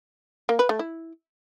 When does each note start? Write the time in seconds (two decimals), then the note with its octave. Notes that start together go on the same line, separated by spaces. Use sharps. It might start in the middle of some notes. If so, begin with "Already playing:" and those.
0.49 A#3
0.59 B4
0.69 A3
0.79 E4